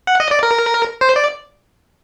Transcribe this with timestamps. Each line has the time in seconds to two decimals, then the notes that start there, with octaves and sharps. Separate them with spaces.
0.07 F#5
0.20 D#5
0.31 D5
0.43 A#4
1.01 C5
1.16 D5